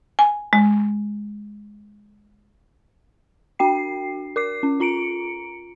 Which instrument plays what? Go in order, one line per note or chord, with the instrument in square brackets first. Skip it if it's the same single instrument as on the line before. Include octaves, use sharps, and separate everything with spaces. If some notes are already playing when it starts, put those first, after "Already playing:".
[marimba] G#5
G#3
[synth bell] D4 F#4 G5 C7
A#4 D6 C7
C#4
F4 A#5 C#7 D7